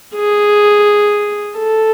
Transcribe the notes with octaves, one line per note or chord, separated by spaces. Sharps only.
G#4
A4